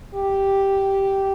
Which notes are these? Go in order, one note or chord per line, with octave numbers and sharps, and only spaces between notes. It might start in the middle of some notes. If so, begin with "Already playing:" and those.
G4